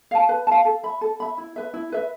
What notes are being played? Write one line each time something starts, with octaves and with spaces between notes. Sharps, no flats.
F5 A5
B4
F5 A5
A4
E5 B5
A4
E5 B5
E4
B4 E5
E4
B4 E5